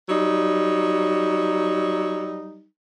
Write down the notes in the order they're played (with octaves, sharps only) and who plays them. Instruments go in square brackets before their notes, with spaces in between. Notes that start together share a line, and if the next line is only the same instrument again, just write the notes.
[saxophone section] F#3 G3 D#4